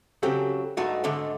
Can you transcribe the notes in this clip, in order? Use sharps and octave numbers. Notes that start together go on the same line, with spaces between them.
C#3 F#3 C4 G4 A4
G2 G#3 A3 D#4 F#4
G#2 D3 G#3 A3